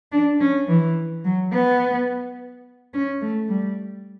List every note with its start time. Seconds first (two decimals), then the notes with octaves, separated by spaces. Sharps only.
0.12 D4
0.40 C#4
0.68 E3
1.24 F#3
1.52 B3
2.94 C#4
3.21 A3
3.49 G3